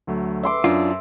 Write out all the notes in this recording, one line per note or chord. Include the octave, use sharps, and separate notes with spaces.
D2 F#3 A3
E5 C6 D6
F#2 D4 F4